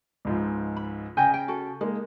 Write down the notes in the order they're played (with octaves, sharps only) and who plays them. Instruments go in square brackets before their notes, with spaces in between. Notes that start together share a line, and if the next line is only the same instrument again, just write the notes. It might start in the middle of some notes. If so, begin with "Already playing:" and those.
[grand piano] C#2 G#2 F3
[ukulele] B5
[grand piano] C#3 G6 [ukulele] D#5 G5 G#5
[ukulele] G5
F#4 A4
[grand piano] G#3 A#3 [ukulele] D#4